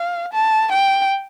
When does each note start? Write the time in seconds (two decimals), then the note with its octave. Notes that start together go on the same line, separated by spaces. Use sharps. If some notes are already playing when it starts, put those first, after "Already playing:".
Already playing: F5
0.33 A5
0.72 G5